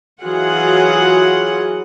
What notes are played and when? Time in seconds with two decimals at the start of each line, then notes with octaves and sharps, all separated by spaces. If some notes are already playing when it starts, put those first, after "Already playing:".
0.22 E3 F#3 F4 G#4 F#5